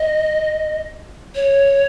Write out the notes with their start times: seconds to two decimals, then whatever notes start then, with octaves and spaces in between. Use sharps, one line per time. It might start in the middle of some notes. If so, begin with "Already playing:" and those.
Already playing: D#5
1.35 C#5